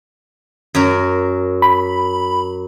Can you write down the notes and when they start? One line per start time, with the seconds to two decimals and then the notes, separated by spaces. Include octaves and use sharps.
0.75 F#2 A#4
1.62 B5